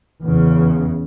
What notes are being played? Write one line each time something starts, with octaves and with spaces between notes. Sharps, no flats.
E2 C#3